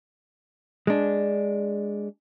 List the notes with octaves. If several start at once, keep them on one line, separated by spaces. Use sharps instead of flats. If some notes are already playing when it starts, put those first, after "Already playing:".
G#3 D4